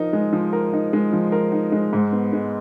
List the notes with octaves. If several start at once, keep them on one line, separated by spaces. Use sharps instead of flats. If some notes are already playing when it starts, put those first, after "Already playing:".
Already playing: F3 D#4 A#4
G#3
F3
A#4
D#4
G#3
F3
A#4
D#4
G#3
G#2
B3
G#3